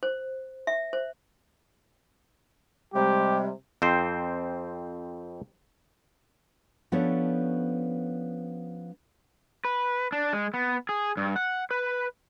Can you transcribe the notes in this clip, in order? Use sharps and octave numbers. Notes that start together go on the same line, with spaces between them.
C5
E5
C5
C3 G3 G#3 G4
F2 C4 C5
F3 B3 C#4 D4 A4 C#5
B4
D4
G#3
B3
G#4
G2
F#5
B4